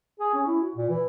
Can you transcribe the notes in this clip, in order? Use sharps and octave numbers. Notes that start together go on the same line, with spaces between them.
G#4
C#4
E4
F#4
A#2
E3